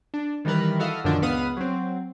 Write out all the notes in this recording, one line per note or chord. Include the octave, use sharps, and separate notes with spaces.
D4
D#3 E3 G3 A#4 B4
E4 F#4 A4 D#5 F5
F#2 A#2 D3 D#3 F3 D4
C#2 B3 B4 F5 D#6
F#3 C4